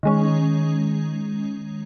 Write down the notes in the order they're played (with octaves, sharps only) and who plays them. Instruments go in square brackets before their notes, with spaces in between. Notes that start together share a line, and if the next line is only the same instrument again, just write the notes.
[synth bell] D#3 G#3 C#4